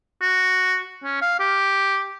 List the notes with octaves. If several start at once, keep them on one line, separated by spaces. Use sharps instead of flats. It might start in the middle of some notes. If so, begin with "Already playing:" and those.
F#4
C#4
F5
G4